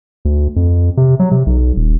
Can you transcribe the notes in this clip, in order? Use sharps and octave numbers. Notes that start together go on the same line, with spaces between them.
D2
F2
C3
F#3
C3
B1
D#1